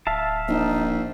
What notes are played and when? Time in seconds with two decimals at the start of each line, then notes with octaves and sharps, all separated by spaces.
0.07 D1 E5 F5 A5
0.48 A#1 D#4